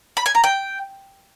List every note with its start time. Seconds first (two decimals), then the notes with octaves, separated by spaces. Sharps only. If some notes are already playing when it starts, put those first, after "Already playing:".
0.17 B5
0.26 G#5
0.35 A#5
0.44 G5